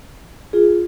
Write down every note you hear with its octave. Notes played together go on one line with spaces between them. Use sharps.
F4 G#4